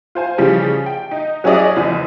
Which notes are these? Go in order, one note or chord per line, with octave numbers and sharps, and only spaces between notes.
F4 C5 G#5
C#3 E3 F3 G3 G4
G5
D#4
F#3 C#4 E4 G#4 D5 D#5
F#1 E2 F3